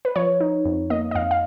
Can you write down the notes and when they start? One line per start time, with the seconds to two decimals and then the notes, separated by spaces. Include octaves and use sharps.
0.05 B4
0.16 F3 C#5
0.40 D#4
0.65 F2
0.90 A#3 D#5
1.11 D#5
1.15 F2 F5
1.31 F5